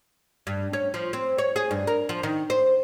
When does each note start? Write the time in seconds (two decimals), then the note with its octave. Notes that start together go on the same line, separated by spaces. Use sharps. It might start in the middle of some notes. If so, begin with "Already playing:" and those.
0.47 G2
0.73 C#4
0.94 F3
1.13 C4
1.38 C#5
1.56 G#4
1.71 G2
1.87 A#4
2.09 F3
2.23 D#3
2.50 C5